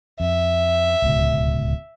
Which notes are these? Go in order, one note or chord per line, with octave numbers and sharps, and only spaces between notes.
F2 E5
D1 C#2 B2